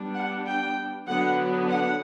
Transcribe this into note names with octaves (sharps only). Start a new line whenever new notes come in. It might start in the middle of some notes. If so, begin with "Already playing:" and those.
Already playing: G3 B3 D4
F#5
G5
D3 F#3 B3 D4 F#5
F#5